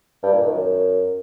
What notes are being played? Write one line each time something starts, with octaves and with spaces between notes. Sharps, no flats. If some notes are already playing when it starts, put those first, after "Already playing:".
G2
A#2
D#3
F#2